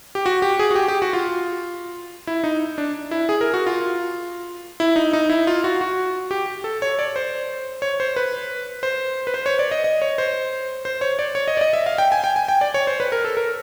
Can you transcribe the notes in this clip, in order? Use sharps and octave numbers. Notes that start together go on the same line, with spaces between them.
G4
F#4
G4
G#4
F#4
G4
G4
F#4
F4
E4
D#4
D4
E4
G#4
A#4
F#4
F4
E4
D#4
D#4
E4
F4
F#4
F#4
G4
A4
C#5
D5
C5
C#5
C5
B4
C5
B4
C5
C#5
D5
D#5
D#5
C#5
C5
C5
C#5
D5
C#5
D#5
D5
D#5
E5
F5
G5
G#5
G5
G#5
G5
D5
C#5
C5
B4
A#4
A4
A#4